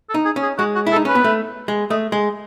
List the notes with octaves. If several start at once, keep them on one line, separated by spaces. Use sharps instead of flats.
A4
D#4
G#4
C#4
G#4
G#3 F#4
F#4
E4
A4
D#4
C#4 B4
B3
A3
G#3
A3 D#5
G#3